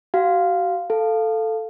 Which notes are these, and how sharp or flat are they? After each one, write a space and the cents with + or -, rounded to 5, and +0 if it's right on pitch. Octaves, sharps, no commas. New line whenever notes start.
F#4 +35 F5 +0
A4 +5 F5 +0